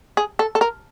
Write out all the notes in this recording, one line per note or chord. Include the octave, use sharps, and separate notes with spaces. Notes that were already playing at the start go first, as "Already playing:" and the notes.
G#4
A4
A4
A#4